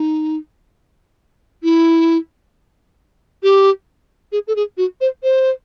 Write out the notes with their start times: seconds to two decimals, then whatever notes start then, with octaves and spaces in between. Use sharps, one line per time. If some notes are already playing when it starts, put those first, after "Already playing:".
Already playing: D#4
1.63 E4
3.43 G4
4.32 G#4
4.47 A4
4.56 G#4
4.77 F#4
5.01 C5
5.23 C5